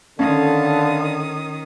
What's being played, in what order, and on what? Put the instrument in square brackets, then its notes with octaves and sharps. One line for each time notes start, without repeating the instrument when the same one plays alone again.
[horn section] D3 [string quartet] D#3 D#6 [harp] C#4 [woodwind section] F5 A5